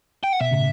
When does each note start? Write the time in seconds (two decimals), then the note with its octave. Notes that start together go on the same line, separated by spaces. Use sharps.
0.23 G5
0.33 F#5
0.41 B2 E5
0.51 A2 C#3